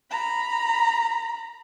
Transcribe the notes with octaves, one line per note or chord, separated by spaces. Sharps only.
A#5 B5